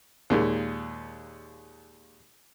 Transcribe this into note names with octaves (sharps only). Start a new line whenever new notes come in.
D#2 A#2 G#3